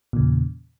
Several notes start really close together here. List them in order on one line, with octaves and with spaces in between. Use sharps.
A#2 C#3 E2